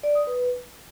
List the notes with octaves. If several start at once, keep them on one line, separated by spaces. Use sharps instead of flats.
D5
D#6
B4